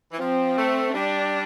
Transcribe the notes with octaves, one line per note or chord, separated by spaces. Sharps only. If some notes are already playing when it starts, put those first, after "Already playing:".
E3
F3 C4
A3
G3 D4